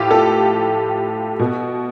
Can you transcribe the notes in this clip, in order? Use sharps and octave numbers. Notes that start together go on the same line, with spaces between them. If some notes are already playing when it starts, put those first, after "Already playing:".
Already playing: A2 F3 F4 G4
A4
B2